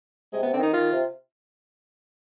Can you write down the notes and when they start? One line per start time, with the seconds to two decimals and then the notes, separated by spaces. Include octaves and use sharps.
0.33 C3 G#3
0.43 B3
0.46 C3
0.53 D3 C4
0.59 D#3 D#4
0.73 D#3 F4
0.93 C3